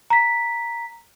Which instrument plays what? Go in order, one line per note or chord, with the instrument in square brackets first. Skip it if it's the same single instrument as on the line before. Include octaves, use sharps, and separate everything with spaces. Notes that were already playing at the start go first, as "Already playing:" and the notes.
[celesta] A#5 B6